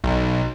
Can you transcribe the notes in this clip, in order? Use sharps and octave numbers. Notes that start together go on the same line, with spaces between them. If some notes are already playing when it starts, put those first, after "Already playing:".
B1